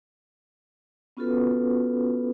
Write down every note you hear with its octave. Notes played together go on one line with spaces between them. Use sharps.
B3 C#4 F4 F#4 A4 B4